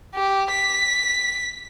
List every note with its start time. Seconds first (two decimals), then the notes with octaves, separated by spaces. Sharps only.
0.15 G4
0.51 B6